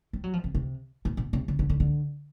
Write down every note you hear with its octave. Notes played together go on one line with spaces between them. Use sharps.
G3
F#3
F3
C3
C3
A#2
B2
C3
C#3
D3
D3
D3